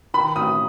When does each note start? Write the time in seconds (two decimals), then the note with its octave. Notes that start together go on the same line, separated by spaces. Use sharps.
0.14 D#3 B5
0.36 A1 D#6